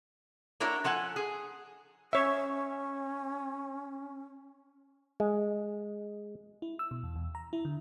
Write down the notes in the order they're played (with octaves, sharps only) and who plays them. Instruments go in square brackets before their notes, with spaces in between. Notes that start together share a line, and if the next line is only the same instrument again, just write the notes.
[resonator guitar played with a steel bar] A#3 D4 E4 F#4 A#4 C#5
F3 A4 F#5 G#5
G#4
[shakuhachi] C#4 [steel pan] C#5 E5
[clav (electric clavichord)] G#3
[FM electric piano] E4
E6
B2
E2
E2
A#5
E4
D3